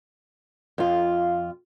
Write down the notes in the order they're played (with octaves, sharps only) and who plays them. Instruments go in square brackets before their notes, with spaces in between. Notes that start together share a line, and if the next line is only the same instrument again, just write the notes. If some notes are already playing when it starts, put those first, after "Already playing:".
[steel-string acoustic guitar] F2 F4